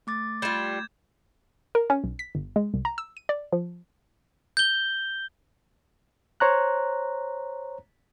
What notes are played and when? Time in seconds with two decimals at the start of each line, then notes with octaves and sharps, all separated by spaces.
0.07 A3 D6 A6
0.42 G3 F4 G6 G#6 E7
1.75 A#4
1.90 C#4
2.04 B1
2.19 B6
2.35 G1
2.56 G#3
2.74 C2
2.85 A#5
2.98 E6
3.17 D#7
3.29 D5
3.52 F3
4.57 G6 G7
6.40 C5 C#5 A#5 F#6